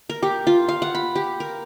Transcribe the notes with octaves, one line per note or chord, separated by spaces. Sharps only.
A#4
G4
F4
F5
F#5
B5
G4
A#4